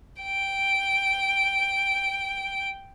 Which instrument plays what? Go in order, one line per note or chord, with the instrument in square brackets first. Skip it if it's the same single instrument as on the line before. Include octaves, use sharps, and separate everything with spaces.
[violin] G5 D7